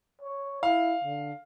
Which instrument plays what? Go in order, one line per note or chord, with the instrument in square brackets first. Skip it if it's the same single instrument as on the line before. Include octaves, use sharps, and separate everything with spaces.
[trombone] C#5
[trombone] E4 [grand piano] F5
[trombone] D3